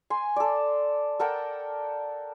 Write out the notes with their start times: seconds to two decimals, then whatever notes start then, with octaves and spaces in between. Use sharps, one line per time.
0.10 G#5 C6
0.36 A4 D5
1.20 A4 A#4 F#5 G5